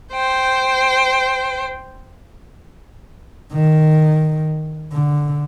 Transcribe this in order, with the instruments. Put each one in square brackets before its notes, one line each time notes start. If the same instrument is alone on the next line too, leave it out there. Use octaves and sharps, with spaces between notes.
[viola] C5 G5
[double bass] D#3
D3